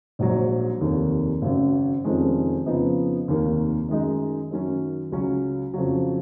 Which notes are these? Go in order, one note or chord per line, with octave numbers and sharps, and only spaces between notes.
A#1 G#2 F#3
F1 D#2 D#3
G#1 F#2 C#3
F1 F2 D#3 G#3 C#4
F2 C#3 F3 B3 D#4
F1 D#2 D#3 A#3
F#2 D#3 G#3 D#4
F#2 D#3 F#3 C#4
C#2 C#3 F#3 C#4
F2 C#3 F#3